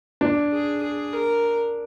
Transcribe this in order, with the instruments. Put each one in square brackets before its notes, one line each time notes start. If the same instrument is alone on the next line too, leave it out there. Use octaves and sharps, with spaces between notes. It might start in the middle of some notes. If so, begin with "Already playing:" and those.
[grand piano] D4
[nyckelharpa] G#4
G#4
A#4